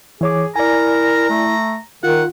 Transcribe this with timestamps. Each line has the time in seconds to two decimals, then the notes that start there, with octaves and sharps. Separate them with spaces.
0.21 E3 G#4 C#5 D6
0.56 E4 A#4 D5 G#5 A#5
1.30 A3
2.03 D#3 F4 A#4 F#5